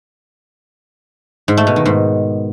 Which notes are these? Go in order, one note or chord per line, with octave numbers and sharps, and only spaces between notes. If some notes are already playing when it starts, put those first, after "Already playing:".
G#2
A3
B2
D#3
G#2